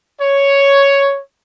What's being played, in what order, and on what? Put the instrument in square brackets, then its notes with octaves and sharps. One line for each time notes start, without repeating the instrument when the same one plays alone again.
[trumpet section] C#5